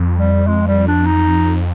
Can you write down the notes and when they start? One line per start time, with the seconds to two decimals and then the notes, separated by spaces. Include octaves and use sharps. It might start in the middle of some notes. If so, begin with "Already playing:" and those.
Already playing: F2
0.17 G3
0.47 G#3
0.68 G3
0.87 D4
1.06 D#4